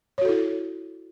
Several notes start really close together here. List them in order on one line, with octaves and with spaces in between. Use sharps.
C#5 F#4 A4 E4